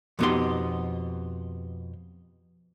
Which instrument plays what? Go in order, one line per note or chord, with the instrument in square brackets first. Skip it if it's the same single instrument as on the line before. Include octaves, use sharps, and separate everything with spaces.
[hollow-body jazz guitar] F2 B2 B3 D#4 G4 C6